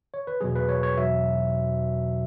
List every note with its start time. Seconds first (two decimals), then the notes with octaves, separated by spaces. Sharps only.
0.14 C#5
0.27 B4
0.41 E2 B2 F#3 G#4
0.55 B4
0.69 C#5
0.83 C#5
0.97 E2 B2 F#3 E5